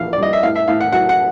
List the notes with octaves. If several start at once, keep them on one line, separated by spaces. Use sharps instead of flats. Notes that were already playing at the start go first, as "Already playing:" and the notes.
Already playing: A#1 E3 F5
D5
G3 D#5
E5
A2 F5
E5
A2 F5
F#5
F#3 F#5
F#5